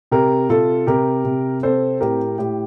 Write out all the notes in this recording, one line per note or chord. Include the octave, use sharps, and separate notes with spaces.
C3 G4 A#4
C3 F4 A4
C3 G4 A#4
C3
C4 A4 C5
A2 G4 A#4
A2 G4